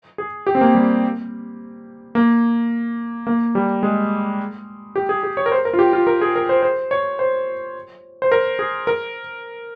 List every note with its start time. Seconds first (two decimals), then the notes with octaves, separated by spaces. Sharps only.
0.18 G#4
0.47 G4
0.55 C4
0.61 A#3
0.75 G3
2.15 A#3
3.27 A#3
3.55 G3
3.83 G#3
4.96 G4
5.09 G#4
5.23 G#4
5.37 C#5
5.46 A#4
5.52 C5
5.65 A#4
5.73 F4
5.79 G4
5.93 F4
6.07 A#4
6.21 G#4
6.35 A#4
6.49 C5
6.63 C5
6.91 C#5
7.19 C5
8.22 C5
8.32 A#4
8.59 G#4
8.87 A#4